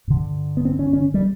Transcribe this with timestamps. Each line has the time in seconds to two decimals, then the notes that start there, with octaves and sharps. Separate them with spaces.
0.08 G2 D3
0.57 B3
0.65 C4
0.79 C#4
0.93 C#4
1.14 G3